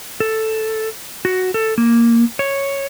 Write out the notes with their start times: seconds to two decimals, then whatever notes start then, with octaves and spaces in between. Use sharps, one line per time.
0.20 A4
1.25 F#4
1.54 A4
1.78 A#3
2.39 C#5